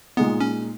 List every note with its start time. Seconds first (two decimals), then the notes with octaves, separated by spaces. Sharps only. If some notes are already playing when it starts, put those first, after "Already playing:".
0.17 A#2 G#3 B3 D#4
0.40 C#4